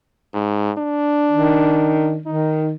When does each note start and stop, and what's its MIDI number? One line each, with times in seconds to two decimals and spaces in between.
0.34 0.71 44
0.78 2.18 62
1.31 2.20 51
2.26 2.74 51
2.26 2.62 63